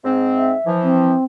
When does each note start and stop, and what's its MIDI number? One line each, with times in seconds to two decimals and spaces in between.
0.04 0.53 44
0.04 0.53 60
0.37 0.71 76
0.66 1.14 52
0.66 1.14 53
0.83 1.24 60